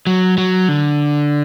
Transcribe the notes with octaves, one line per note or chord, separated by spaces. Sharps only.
F#3
F#3
D3